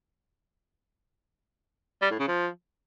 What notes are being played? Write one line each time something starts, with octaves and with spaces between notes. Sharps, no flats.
G3
A2
C#3
F3